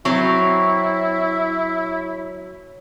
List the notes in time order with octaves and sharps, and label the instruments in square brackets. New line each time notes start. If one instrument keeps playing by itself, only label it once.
[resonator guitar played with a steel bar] F#3 C4 [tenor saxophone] E4 [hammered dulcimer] C#5